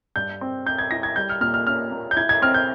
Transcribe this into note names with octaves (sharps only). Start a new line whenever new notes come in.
G2 G6
C4
C4 G6
G#6
E4 A#6
G#6
G3 G6
F6
A#2 F6
F6
C#4 F6
A#3
G6
E4 G#6
G#6
C4 F6
G6